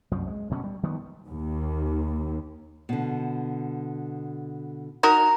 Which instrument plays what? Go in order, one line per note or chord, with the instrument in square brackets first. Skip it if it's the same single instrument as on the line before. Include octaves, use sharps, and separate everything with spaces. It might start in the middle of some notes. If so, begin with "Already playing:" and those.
[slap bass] C2 F#2 F3
G#3
D2 B2 A3 C#4
G3
D#3 F3 G3 B3
[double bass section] D#2
[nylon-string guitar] B2 D3
[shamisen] D#4 F#4 A#4 [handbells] A#5